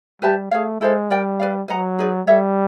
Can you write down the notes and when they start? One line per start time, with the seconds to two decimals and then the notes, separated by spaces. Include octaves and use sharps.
0.22 G3 G4 B4 E5 A5
0.51 A3 G#4 C#5 F5
0.81 G#3 E4 A4 C5 F5
1.10 G3 A#4 D5 G5
1.39 B4 D5 F5
1.68 F#3 B4 D#5 F#5 A#5
1.98 D#4 G#4 B4 D5
2.27 G3 A4 C#5 E5